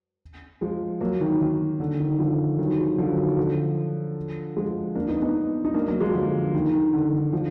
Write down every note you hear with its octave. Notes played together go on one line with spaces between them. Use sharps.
F3 G#3
F#3 A#3
D#3 F#3
D#3
D3
D#3
D3 F3
D#3 F#3
F3 G#3
D3 F3
D#3 F#3
D3 F3
F3 G#3
A#3 D4
B3 D#4
B3 D#4
D#4
A#3 D4
F#3 A#3
F3 G#3
D3 F3
D#3
D#3
D3
D#3
D3 F3